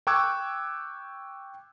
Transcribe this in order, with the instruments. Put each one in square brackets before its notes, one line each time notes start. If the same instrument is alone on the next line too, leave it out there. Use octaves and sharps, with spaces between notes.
[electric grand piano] G5 C#6 D6 E6 F#6 G#6